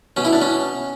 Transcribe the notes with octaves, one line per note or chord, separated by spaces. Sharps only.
B2 C#4
E4
D4
C#4